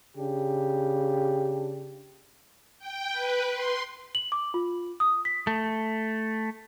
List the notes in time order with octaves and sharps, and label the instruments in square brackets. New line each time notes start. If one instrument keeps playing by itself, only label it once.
[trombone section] C#3 D4 G4
[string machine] G5
B4
C6
[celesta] F#7
D6
F4
D#6
B6
[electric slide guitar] A3